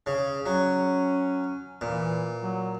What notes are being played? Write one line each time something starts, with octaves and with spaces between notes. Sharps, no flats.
C#3
F#3 C#4
A#2 E3
F#3